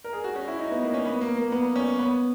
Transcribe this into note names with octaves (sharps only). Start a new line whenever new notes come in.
A#4
G#4
F#4
C#4
E4
D#4
B3
A#3
C#4
B3
A#3
A#3
B3
C#4
B3